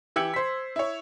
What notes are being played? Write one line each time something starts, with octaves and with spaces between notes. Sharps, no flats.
E3 G4 E6 G#6 C#7 F#7
C5 B6
E4 C#5